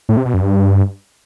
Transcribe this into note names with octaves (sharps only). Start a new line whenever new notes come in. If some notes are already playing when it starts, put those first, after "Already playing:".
A2
C3
B2
F#2
G2